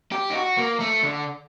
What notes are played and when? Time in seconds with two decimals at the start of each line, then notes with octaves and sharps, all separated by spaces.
0.12 G4
0.30 D#4
0.35 F#4
0.57 A#3
0.80 A3
1.03 D3